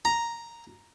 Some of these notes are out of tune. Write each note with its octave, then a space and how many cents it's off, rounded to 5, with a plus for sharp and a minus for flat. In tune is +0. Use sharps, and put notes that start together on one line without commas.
A#5 +0